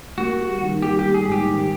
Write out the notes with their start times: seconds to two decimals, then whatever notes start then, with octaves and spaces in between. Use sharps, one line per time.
0.18 A#3 F#4
0.40 G3
0.61 D#3
0.82 G3 G4
0.99 G4
1.04 A#3
1.14 G#4
1.26 G#2
1.32 G4
1.47 D#3